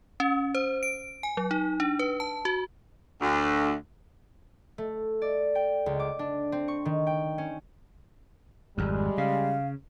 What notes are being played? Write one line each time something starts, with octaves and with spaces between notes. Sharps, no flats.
C#4
C5
D7
G#5
F#3
D#4
D4
B4
A5
F#4
D2
A3
D5
G5
C#2
D6
D4
C4
C#6
D#3
G5
C#4
G#1 F2 G3 G#3
C#3 F5